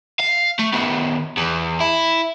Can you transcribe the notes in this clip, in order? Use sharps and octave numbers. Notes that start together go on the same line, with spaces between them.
F5
A3
D#3 B3
E2
E4